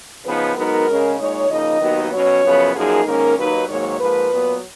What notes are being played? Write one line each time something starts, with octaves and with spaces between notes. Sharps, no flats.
C#3 F3 B3 D#4 B4
G#2 F#3 B3 D#4 A#4
C#3 G#3 C#4
A#2 G#3 D#4 C#5
C#3 F3 A#3 D#4 D#5
D#2 D#3 F#3 B3 D#4
B2 F#3 C#4 C#5
F#2 C#3 F3 B3
F#2 F3 A#3 D#4 G#4
G#2 D#3 A#3 C#4 A#4
D#2 D#3 F#3 A#3 D#4 B4
G#2 D#3 F#3 A#3 C#5
G#2 F3 A#3 B4
A#2 F#3 B3